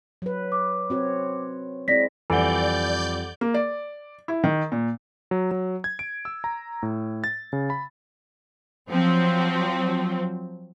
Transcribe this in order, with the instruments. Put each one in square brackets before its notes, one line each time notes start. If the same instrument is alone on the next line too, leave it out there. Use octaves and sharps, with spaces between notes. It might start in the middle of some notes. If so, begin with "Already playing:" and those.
[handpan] F#3 B4
[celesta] D6
[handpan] C4 F#4 C#5
[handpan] G#3 C4 E4 [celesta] D5 A#6 B6
[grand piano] F2 G3 [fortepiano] E3 [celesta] A4 F#5 [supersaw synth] D5 G6
[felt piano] A#3
D5
E4
D#3
A#2
[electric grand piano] F#3
F#3
G#6
D7
E6
A#5
A2
A6
C#3
B5
[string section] F3 F#3 C4